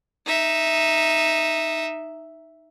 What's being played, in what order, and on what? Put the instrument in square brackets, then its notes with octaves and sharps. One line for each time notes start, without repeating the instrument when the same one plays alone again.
[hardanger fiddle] D#4 E5